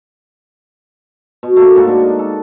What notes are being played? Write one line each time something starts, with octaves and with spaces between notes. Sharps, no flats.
B2
A3 A#3 F#4
G#2 A#3 F#4 A5
D4
D#5
A4